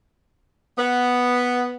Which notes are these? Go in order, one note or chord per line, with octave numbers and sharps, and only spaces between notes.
B3